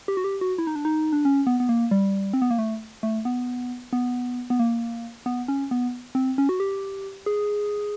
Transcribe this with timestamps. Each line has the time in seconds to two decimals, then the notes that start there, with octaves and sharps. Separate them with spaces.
0.08 G4
0.17 F#4
0.24 G4
0.41 F#4
0.58 E4
0.67 D#4
0.76 D4
0.85 D#4
1.13 D4
1.25 C#4
1.47 B3
1.60 B3
1.69 A#3
1.91 G3
2.33 C4
2.42 B3
2.51 A#3
2.59 A3
3.03 A3
3.25 B3
3.93 B3
4.50 B3
4.59 A#3
5.26 B3
5.48 C#4
5.71 B3
6.15 C4
6.38 C#4
6.49 F#4
6.60 G4
7.26 G#4